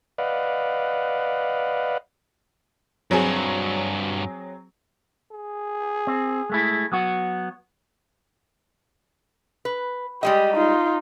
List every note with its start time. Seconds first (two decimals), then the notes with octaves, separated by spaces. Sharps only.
0.18 B4 D5 D#5 F5 F#5
3.11 G2 F#3 C4 F#4 G#4
5.32 G#4
6.07 C4
6.50 G#3 A3 E4
6.92 F#3 B3 F#4
9.65 B4
10.23 G3 G#3 G4 D#5
10.54 D#4 F4